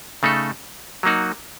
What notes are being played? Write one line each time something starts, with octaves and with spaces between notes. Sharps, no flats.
C#3 A3 D#4 A4
F#3 A#3 D#4 F#4